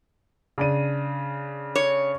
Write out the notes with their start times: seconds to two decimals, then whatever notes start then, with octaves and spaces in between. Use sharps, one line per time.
0.58 C#3 D4 D#7
1.75 C#5